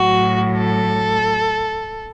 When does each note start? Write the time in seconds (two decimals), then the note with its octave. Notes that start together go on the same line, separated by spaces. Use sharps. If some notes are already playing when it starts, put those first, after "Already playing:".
Already playing: A2 F#3 F#4
0.58 A4